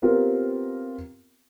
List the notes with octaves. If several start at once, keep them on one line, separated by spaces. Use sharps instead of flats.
B3 C4 F4 G4 A#4